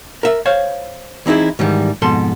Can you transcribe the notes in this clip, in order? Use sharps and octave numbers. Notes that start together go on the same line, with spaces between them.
A#4 E5
C5 C#5 F5
E3 C4 D#4 E4 G#4
G#2 D#3 E3 G3
F2 G#2 B2 A4 C6